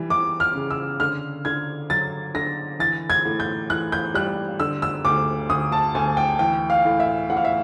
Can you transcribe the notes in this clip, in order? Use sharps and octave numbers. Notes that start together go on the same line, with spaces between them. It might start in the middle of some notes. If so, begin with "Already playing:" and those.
Already playing: E3 G3
E3 D6
F6
C#3
E6
D3 F6
D3 G#6
F#3 A6
D3 A#6
E3 A6
G#6
A2
G6
E3 F#6
G6
G3 F#6
D3 E6
E6
D2 D6
D2 D#6
A5
D2 G#5
G5
E3 G5
F5
A2
E5
A2 F#5
F5
E5